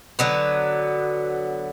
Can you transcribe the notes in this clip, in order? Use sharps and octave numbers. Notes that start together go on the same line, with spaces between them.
D3 F#3 B3